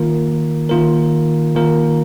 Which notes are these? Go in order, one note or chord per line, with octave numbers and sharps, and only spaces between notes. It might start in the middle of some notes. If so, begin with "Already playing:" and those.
Already playing: D#3 A#3 F4 A#4
D#3 A#3 F4 A#4
D#3 A#3 F4 A#4